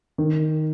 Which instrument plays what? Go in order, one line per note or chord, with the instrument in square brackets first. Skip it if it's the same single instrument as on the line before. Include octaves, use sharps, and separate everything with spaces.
[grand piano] D#3